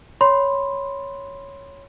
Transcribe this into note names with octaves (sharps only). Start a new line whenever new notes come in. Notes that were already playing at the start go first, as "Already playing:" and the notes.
C#5 B5 C6